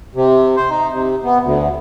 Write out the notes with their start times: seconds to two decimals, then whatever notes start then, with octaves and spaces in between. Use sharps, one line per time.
0.15 C3
0.56 C5
0.70 D#4
0.92 C3
1.24 B3
1.44 D2